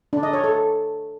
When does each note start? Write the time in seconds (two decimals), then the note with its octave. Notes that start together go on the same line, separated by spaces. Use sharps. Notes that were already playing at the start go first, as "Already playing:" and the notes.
0.13 D4
0.23 D#5
0.33 C#5
0.44 A4